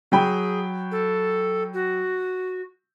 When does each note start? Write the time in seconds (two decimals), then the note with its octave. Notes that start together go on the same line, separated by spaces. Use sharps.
0.12 F#3 G#4 G5 B5
0.92 A4
1.74 F#4